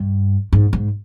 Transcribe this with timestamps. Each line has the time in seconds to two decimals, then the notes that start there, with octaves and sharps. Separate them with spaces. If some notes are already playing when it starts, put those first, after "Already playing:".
Already playing: G2
0.53 G#2
0.73 G#2